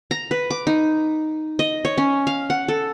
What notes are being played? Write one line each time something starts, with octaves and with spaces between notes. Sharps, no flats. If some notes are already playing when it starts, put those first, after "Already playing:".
A#5
B4
D6
D#4
D#5
C#5
C#4
F5
F#5
A4